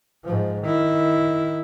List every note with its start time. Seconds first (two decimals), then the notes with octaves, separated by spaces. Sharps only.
0.25 G#2 F3
0.63 D#3 E4